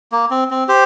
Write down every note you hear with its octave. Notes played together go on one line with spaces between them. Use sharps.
A#3
C4
C4
G4 C5